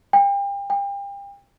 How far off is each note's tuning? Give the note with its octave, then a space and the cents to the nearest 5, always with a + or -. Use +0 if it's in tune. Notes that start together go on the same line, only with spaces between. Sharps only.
G5 +35
G5 +35